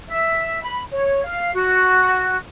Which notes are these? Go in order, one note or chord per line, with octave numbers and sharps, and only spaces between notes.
E5
B5
C#5
F5
F#4